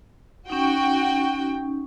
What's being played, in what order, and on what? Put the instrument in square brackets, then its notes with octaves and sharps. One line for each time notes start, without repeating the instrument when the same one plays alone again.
[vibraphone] C#4 D#4 [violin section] F#4 G5